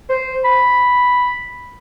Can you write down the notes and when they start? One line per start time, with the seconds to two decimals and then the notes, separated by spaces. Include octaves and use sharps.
0.10 C5
0.44 B5